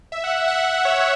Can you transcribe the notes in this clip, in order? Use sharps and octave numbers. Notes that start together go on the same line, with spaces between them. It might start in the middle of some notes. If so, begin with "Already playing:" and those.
E5
F#5
E5
F#5
E5
F#5
C#5 E5